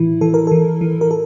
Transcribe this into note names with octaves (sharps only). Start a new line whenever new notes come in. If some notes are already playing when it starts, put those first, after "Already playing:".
Already playing: A2 E3 E4
E3 A4
A#4
E3 A4
E3
A#4
A4